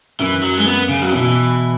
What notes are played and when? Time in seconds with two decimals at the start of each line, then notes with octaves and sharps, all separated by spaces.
0.20 F#2 E3
0.43 F#3
0.57 G#3
0.66 B3
0.89 C#3
1.02 F#3
1.12 B2 E3